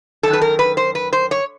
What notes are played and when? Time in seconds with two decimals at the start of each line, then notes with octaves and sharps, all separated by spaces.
0.23 F#2 D#3 A4
0.33 B4
0.42 A#4
0.59 B4
0.77 C5
0.95 B4
1.13 C5
1.31 C#5